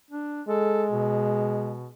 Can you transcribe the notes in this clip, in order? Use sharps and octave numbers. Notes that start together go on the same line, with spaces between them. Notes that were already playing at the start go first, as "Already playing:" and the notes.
D4
G#3 A4
B2